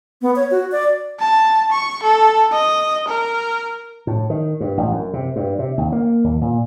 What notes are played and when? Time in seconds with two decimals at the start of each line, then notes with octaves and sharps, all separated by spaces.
0.22 B3
0.36 C#5
0.51 F#4
0.72 D5
1.20 A5
1.71 C#6
2.03 A4
2.52 D#5
3.08 A#4
4.07 A2
4.30 D#3
4.60 G2
4.77 A1
4.92 F#2
5.14 C3
5.36 G2
5.59 C3
5.78 D#2
5.92 A#3
6.24 D#2
6.41 A#2